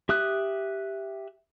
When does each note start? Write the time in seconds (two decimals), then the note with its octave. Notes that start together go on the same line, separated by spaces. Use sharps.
0.09 G4 E5 D#6 F#6